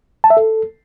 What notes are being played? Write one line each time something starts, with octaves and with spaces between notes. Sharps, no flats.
A5
E5
A4